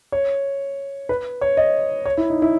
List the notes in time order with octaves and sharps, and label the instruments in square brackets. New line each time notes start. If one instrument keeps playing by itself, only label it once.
[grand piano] C#5
B4
C#5
D#5
C#5
E4
D#4
E4